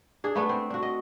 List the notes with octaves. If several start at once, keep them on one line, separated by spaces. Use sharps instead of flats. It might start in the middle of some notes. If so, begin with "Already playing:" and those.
D4 G#4
A3 B3 D4
C4
D4 F#4
D#5